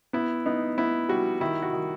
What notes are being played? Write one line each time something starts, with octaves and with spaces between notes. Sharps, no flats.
B3 E4
B3 D#4
B3 E4
G3 F#4
D#3 E4
F#4
D#3